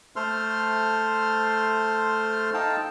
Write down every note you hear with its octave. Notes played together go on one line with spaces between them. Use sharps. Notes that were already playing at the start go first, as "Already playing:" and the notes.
A3 A4 C5 C6 F6
D#4 A4 F5 G5 A5